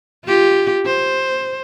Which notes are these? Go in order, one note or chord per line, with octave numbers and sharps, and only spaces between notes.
F4 G4
C5